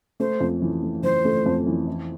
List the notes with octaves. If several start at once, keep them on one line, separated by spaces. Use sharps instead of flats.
A3 C5
F2
E3
A3
E3 C5
A3
F2
E3
E4